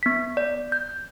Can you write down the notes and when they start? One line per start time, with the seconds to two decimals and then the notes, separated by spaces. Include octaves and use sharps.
0.03 B3 B6
0.37 D5
0.72 G6